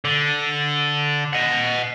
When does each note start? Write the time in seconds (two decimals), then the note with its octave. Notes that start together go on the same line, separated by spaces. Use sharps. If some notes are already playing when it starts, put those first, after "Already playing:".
0.05 D3
1.33 D#5 F#5